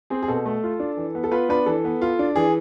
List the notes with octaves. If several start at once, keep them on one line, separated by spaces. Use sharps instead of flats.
C4 G#4
G#4
B2 A4
A3
F4
D4
E3
B3
A4
B3 F4 B4
B3 D4 B4
E3 A4
B3
F4
D4
E3 G#4